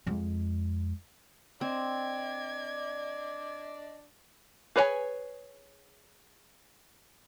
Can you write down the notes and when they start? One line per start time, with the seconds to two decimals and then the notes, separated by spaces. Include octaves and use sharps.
0.06 F2 G#3
1.61 C4 D4 D5 D#5 G#6
4.76 G#4 B4 C#5 D5 G#5